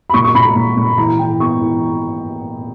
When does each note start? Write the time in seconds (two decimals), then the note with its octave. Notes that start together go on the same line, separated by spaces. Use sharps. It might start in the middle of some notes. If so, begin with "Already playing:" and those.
0.10 B5
0.14 A#2 C#6
0.24 C#6
0.35 A#2 B5
0.45 A#5
0.56 A#2
0.77 A#2
0.98 E3 A#5
1.09 A#5
1.19 E3 G5
1.40 B3 C#6
1.61 E3